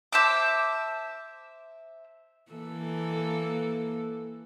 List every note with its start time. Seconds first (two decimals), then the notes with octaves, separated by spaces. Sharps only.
0.12 C5 E5 A5 D6
2.52 E3 A#3 A4